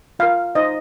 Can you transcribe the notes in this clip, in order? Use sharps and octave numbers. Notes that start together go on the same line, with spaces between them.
F4 A#4 F5
D#4 C5 D#5